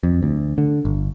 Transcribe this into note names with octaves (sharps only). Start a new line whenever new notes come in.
F2
D2
D3
G1